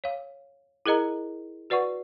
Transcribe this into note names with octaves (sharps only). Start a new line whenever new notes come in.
C#5 F5
E4 G#4 A#4 D#5 A#5
F#4 B4 D5 F#5 C#6